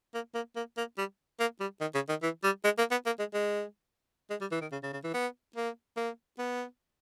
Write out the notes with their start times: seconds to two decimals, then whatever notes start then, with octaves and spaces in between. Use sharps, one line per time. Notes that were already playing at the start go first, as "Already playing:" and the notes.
0.14 A#3
0.35 A#3
0.56 A#3
0.77 A#3
0.98 G3
1.40 A#3
1.60 G3
1.81 D#3
1.94 C#3
2.09 D#3
2.22 E3
2.44 G3
2.64 G#3
2.78 A#3
2.91 B3
3.06 A#3
3.19 G#3
3.34 G#3
4.30 G#3
4.41 G3
4.51 E3
4.61 D#3
4.72 C#3
4.83 C#3
4.93 C#3
5.04 E3
5.14 B3
5.56 A#3
5.97 A#3
6.39 B3